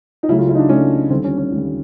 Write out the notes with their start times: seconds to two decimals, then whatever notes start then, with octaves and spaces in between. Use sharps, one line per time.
0.23 D#4
0.28 C#2 C#3 F#3 A3 E4
0.38 F4
0.49 E4
0.55 D#4
0.59 D4
0.69 C#2 C#3 F#3 A3 C#4
1.10 D#2 D3 G3 C4
1.24 C#4
1.38 C#4
1.52 D#2 D3 G3